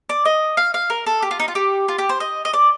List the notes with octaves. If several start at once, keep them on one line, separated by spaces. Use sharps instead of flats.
D5
D#5
F5
F5
A#4
A4
G4
F4
D#4
F4
G4
F4
G4
C5
D#5
D#5
D5